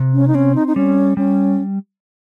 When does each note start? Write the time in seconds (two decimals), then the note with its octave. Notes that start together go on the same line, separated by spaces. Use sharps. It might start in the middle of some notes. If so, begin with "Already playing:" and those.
Already playing: C3
0.14 C#4
0.28 D#4
0.34 C4 C#4
0.55 D#4
0.67 D#4
0.76 G3 C#4
1.17 G3 C#4